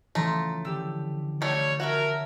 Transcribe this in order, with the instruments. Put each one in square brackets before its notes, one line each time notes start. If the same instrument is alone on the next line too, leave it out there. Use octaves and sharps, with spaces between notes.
[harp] C#3 E3 F3 [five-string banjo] A3 [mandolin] F4 A#5
[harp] D3 G4 [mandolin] E6
[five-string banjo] G3 A3 [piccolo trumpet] C#5 [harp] G6
[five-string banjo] F#4 [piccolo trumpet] A#4 [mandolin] C#5 E5 A5